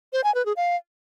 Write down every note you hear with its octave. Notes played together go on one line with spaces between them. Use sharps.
C5
G#5
B4
G#4
F5